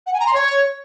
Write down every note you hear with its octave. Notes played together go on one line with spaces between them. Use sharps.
F#5
G#5
A#5
C6
C#5